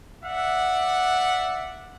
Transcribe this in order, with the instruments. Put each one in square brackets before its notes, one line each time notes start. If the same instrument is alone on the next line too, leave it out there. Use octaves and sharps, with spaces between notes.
[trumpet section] D5 E5 F#5